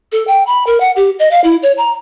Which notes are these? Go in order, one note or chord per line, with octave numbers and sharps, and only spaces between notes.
A4
G5
B5
A#4
F#5
G4
D#5
F5
E4
C#5
A#5